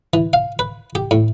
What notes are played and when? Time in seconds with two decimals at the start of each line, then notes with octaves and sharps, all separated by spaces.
0.14 E3
0.33 F5
0.59 B4
0.95 G4
1.11 A2